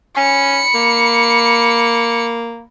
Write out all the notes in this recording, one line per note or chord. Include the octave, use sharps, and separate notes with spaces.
C#4 B5 C#7
A#3